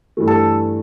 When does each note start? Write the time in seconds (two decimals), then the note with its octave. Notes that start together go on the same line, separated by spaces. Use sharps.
0.17 G2 E3 A3
0.27 A4